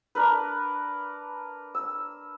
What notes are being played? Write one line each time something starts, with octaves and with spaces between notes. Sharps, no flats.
D4 A#4 B4
E6